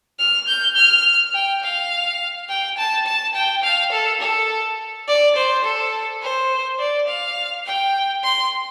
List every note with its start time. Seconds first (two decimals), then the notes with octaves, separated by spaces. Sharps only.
0.19 F6
0.48 G6
0.76 F6
1.34 G5
1.64 F5
2.49 G5
2.78 A5
3.06 A5
3.35 G5
3.64 F5
3.92 A4
4.21 A4
5.08 D5
5.36 C5
5.65 A4
6.22 C5
6.79 D5
7.08 F5
7.66 G5
8.24 C6